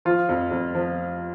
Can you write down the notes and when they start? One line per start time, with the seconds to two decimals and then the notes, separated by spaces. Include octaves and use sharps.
0.05 F3 F4
0.29 F2
0.51 F2
0.75 F3